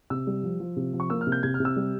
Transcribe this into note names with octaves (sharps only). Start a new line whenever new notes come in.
C3 E6
G3
F3
F3
C3
F3
C#6
A#3 E6
F6
C3
G6
C3 G#6
F6
C3
E6
G3